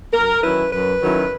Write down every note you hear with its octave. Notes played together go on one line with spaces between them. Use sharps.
F#2 A#4
D#3 F#3 C#4 E4 B4
F#2 B4
D#3 F#3 C#4 E4